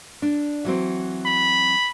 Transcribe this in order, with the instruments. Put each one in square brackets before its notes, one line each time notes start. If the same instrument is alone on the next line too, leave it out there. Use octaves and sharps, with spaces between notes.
[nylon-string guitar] D4
E3 F#3 C4
[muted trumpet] B5